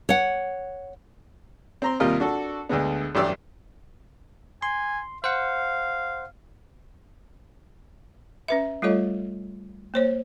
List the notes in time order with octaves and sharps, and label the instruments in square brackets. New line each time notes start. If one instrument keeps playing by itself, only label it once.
[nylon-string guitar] C#5 F#5
[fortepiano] C4 A#5 C6
D#2 C3 G3 F4 A#4 D#5
D4 F#4 A4
D2 D3 G#3 B3
A1 G2 F#3 G4 D5 E6
[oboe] G#5 [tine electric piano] C6
[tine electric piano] C5 F#5 [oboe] F5
[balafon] C#4 B4 E5
G3 A3 F4 A4 C#5 D#5
A#3 C5 C#5